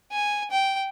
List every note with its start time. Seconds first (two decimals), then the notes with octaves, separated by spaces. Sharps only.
0.12 G#5
0.51 G5